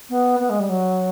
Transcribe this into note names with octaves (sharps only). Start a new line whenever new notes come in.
B3
B3
G#3
G3
F#3